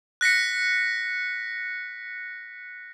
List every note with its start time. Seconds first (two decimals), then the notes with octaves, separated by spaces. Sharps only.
0.21 F#6 A#6 B6 C#7